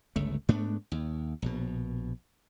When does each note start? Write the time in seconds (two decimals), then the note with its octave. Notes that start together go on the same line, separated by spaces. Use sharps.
0.16 G1 C#2 A3
0.49 G#2 A3 B3 D4
0.92 D#2
1.42 A#1 B2